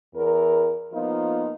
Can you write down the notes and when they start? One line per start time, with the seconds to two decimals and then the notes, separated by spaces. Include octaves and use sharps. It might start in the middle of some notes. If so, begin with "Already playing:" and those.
0.15 E2 A#4
0.93 F3 A#3 B3 D#4 F4